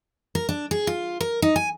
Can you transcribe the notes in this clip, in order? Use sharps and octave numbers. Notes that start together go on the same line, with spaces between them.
A#4
D4
G#4
F4
A#4
D#4
G#5